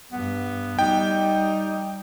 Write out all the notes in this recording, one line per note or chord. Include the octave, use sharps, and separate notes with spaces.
G2 B3
G3 D#4 G5